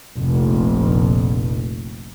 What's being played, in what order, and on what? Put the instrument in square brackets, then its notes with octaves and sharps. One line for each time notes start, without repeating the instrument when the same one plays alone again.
[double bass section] F1 A#1